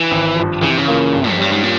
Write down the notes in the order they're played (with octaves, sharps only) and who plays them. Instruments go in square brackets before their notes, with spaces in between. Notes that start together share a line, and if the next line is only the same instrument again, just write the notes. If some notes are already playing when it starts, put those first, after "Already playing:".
Already playing: [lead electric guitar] E3
[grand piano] G#1
G2 F3
[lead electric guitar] C#3 [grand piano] E3
[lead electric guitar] C3
C#3
[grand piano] A#3 F4 A#4
G2
[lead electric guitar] F2
[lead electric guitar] G2 [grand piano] G3 C#4
[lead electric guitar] G#2
A#2